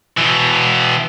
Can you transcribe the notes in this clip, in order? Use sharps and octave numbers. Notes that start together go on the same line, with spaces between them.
B2 E3